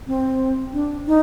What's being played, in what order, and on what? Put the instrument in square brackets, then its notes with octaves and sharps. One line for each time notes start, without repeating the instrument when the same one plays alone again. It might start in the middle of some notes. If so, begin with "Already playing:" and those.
[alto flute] C4
D4
D#4